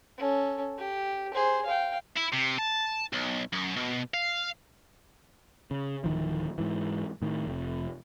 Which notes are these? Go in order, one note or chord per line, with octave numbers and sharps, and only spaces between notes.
C#4 A4
G4
G#4 C5
F5 G5
E4
C3
A5
B1
F#2
B2
F5
C#3
D1 D#3 F3
G#2 E3
A2 D#3
F1 F2